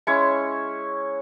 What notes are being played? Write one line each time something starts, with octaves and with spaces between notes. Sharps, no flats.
G#3 C#4 E4 C#5 C#6